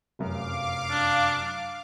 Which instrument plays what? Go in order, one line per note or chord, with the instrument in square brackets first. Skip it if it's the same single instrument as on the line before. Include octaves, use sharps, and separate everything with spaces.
[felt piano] F1 F#2 [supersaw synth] F5 D6
[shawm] D4